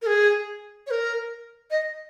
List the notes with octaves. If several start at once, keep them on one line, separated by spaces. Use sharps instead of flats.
A#4
G#4
C#5
A#4
D#5